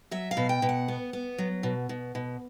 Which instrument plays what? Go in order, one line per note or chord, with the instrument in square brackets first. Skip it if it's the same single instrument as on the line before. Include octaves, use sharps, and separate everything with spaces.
[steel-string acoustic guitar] F#3 E5
F5
B2
G5
B2
F#5
B3
B3
F#3
B2
B2
B2